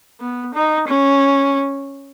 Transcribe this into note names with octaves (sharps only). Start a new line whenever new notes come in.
B3
D#4
C#4